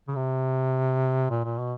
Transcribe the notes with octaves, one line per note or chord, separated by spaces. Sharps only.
C#3
C3
A#2
A#2
B2